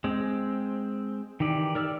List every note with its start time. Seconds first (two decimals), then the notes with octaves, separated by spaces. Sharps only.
0.04 G#3 C4
1.40 D#3 E3 G4 D5
1.75 A#4 D5 E6 F6